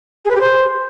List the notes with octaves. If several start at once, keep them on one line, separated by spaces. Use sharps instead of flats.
G#4
B4
G4
C5